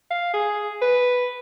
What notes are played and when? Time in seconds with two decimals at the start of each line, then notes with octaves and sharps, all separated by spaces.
0.11 F5
0.34 G#4
0.82 B4